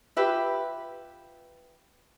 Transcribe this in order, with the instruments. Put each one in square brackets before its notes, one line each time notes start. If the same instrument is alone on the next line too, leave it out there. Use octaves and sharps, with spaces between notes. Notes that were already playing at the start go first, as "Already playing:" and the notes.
[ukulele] F4 G4 B4 E5